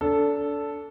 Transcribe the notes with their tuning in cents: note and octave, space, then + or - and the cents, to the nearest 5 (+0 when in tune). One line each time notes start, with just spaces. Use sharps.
D4 -30 A4 +0